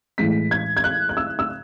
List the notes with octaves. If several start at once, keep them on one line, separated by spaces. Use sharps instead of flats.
A2 E3 G#3 B6
G#6
G#6
F#6
F#6
E6
E6